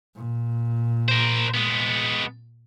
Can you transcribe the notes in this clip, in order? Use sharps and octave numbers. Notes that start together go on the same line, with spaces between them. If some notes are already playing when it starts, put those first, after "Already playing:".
A#2
A#4 C5
G#3 B3